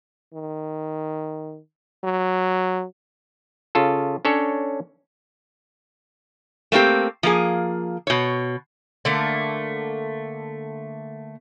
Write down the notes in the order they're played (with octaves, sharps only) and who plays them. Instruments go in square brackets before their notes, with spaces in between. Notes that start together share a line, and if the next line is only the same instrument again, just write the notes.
[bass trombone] D#3
F#3
[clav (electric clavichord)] C#3 F4 A4
C#4 D4 A4 C#5
[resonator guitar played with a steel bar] A3 A#3 C4 G4
F3 A#3 G#4
B2 C#5
[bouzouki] D3 A3 A#3